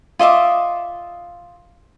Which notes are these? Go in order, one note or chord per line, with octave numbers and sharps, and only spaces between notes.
F4 D#5 E5 D6